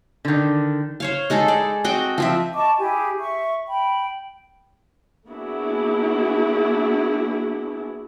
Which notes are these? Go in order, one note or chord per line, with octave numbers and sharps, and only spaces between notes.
D3 D#3
C5 C#5 F5
G#3 D#4 G#4 A4
D5
C4 F#4 D#5 G5
F3 C4 E5
D#5 A5 C#6 D6
E4 G4 G#4 G#5
E5 C#6
G5 B5
A#3 B3 D4 E4 F#4 G#4